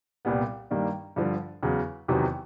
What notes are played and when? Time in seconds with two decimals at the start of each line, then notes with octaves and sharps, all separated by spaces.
0.25 C2 A#2 G3 B3
0.71 G2 D#3 G3 A#3 D4
1.16 G2 D3 F3
1.63 E2 C#3 F#3
2.08 E2 C3 D#3 F#3 B3